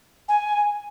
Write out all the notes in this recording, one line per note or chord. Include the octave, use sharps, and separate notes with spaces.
G#5